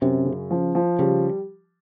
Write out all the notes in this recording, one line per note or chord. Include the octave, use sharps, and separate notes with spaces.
F#2 C3
C#3
F3
F3
C#3 G3